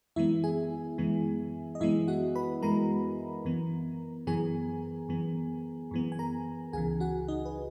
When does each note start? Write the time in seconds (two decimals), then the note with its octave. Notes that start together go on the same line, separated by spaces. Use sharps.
0.16 F#2 E3 G#3 B3 E4 E5
0.44 G#4 G#5
0.98 F#2 E3 G#3 B3
1.75 D#5
1.80 F#2 E3 G#3 B3 E4 E5
2.08 F#4 F#5
2.35 B4 B5
2.62 F#2 E3 G#3 B3 A#4 A#5
3.45 F#2 E3 B3
4.27 F#2 E3 B3 G#4 G#5
5.09 F#2 E3 B3
5.91 F#2 E3 B3
6.12 G#5
6.19 A#4 A#5
6.73 C#2 C#3 E3 G#4 G#5
7.00 F#4 F#5
7.28 D#4 D#5
7.45 B4